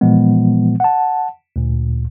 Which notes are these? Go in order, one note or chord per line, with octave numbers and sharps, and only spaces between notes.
A#2 E3 F3 G#3 B3
F#5 A5
D2 A#2